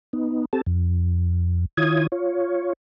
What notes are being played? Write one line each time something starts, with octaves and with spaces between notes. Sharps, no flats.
B3 D#4
C4 G4 A4 A5
F2
D#3 E4 F4 C#5 D#6 G#6
F4 C#5